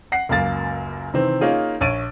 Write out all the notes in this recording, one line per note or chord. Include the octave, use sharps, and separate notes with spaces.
F#5 C7
C#2 F#2 A#3 A6
C3 D#3 E3 C4
A#3 C#4 D#4 F4 G#4
A#1 C#5 A6 D7 D#7